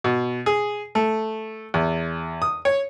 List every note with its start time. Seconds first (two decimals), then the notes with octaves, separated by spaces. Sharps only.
0.04 B2
0.46 G#4
0.95 A3
1.74 E2
2.42 D#6
2.65 C#5